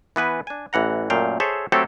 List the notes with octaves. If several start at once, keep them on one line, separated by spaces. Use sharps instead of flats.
E3 B3 B4 G#5
D4 G#5
A1 E3 F#5 A#5
F#2 A#2 A3 F5 G5
G#4 A4 C5 C#5 E5
F#3 A3 C4 G4 A4 C#5